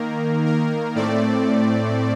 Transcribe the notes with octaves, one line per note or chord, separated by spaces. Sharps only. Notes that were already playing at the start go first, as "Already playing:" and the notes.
Already playing: D#3 A#3 A#4
A#4
A2 A3 C4 D5